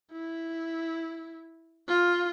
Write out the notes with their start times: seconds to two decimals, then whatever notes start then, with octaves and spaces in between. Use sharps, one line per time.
0.12 E4
1.88 F4